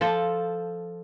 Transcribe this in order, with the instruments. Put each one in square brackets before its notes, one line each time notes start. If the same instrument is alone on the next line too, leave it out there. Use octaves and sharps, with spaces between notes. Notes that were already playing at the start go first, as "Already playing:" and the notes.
[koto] F3 A4